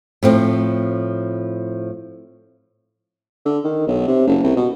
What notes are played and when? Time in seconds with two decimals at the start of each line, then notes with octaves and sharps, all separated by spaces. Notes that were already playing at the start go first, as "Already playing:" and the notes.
0.23 A2 F3 C4
3.45 D3
3.64 D#3
3.87 B1
4.07 C3
4.27 F#1
4.43 C2
4.56 B2